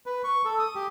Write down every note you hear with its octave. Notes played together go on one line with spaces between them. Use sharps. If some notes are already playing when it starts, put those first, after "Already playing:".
B4
C#6
A4
D#6
G4